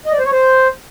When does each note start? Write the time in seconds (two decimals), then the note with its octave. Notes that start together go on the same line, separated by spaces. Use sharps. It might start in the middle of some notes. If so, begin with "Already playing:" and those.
0.06 D#5
0.13 D5
0.19 C5
0.26 C#5
0.32 C5